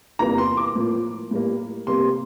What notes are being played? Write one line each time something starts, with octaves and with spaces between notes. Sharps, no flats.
E2 C3 E3 G3 A#3 A#5
C6
D6
A2 F3 A#3
A2 G3 A#3
C3 G3 A#3 C6